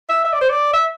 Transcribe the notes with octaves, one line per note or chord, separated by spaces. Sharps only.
E5
E5
D5
C5
D5
E5